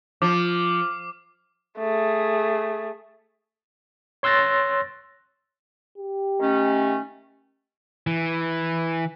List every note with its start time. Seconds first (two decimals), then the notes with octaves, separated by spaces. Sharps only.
0.22 F3 D6
1.78 A3 G#4
4.23 C#5 C6 E6 F#6 A6 A#6
5.98 G4
6.39 D#3 A3 C#4
8.07 E3